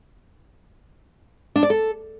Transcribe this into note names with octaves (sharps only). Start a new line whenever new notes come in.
D4
D5
A4